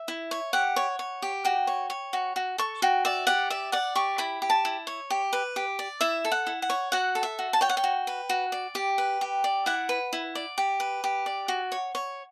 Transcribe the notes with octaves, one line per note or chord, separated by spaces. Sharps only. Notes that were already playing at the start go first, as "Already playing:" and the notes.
Already playing: E5
E4
C#5
G4 F#5
C#5
C#5
G4
F#4 G5
C#5
C#5
F#4
F#4
A4 C#6
F#4 G5
D5 E5
G4 F#5
D5 E5
D5 F#5
G4 C#6
E4 B5
G4
A5
E4
C#5
G4
B4
G4
D5
E4 E5
A4
F#5
E4
F#5
C#5
F#4 F#5
A4
E5
F#4
A5
C#5 G5
F#5
G5
F#4
B4
F#4
D5
G4
B4
G4
D5
E4 F#5
B4
E4
D5
G4
B4
G4
D5
F#4
C#5
C#5